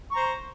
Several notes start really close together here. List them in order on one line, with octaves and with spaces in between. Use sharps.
C#6 A#5 C5